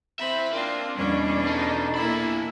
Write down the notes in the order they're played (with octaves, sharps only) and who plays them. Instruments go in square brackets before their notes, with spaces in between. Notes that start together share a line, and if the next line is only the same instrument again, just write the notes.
[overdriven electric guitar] E3 E5 [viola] C4 B5
[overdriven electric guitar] A#3 [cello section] C4 [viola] D4 F4
[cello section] E2 B2 D4 [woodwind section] G3 [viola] C#4
[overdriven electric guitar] D#4 [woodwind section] A4 A5 A#5
[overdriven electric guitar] A#2 B5 [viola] A#3 E4